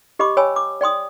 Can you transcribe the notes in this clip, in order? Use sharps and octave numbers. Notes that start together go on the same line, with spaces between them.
G4 D#5 B5 C6 D6
C#5 G5 G#5 B5 E6
D6
D5 G5 C6 D#6